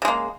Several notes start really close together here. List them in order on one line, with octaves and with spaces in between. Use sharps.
C#3 G#3 A#3